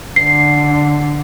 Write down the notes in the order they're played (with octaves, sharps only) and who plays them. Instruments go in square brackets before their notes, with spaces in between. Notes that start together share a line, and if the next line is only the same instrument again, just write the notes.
[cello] D3 [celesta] C7